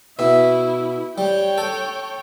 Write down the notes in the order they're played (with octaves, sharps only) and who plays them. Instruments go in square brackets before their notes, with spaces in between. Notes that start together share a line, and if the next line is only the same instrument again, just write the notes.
[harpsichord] B2 [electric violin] E4 [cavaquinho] E5
[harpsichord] G3 [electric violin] C#5 G5
[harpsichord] A4 [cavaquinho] A5